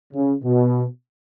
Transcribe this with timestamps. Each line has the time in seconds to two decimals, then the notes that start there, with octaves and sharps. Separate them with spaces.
0.13 C#3
0.43 B2